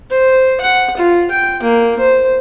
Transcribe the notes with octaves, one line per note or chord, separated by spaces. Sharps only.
C5
F#5
F4
G5
A#3
C5